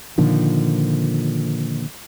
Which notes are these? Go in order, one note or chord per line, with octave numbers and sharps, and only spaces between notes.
A#2 D3 D#3 F3